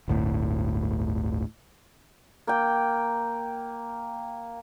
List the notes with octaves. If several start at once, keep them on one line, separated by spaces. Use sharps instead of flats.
G1 D2 A2
A#3 G5